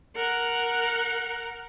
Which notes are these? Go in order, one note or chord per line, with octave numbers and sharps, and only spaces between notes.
A#4 F#5